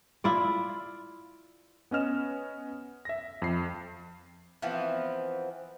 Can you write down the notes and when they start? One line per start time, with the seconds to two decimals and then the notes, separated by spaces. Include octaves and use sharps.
0.24 E4 F4 D5
1.91 B3 C#4 D#5 F6 E7
3.05 E5 A#6
3.42 F2 C7
4.62 E3 F3 B3 C4